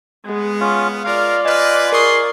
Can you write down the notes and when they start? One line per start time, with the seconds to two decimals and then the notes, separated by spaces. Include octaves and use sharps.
0.25 G#3 B3
0.61 C#4 F4
1.04 G#3 F4 A#4 D5 F5
1.45 B4 D#5 G#5 F6
1.92 G#4 A#4 C6 C#6 D#6